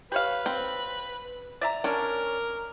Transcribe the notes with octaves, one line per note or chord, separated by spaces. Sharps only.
G4 B4 C#5 F5
C4
D5 E5 A#5
C#4 D4 A#4